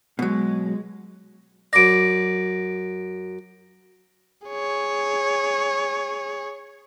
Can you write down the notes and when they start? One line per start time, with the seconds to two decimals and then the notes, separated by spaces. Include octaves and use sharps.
0.19 B2 F#3 G#3
1.73 F#2 D5 A#6 D7
4.48 G#4 C#5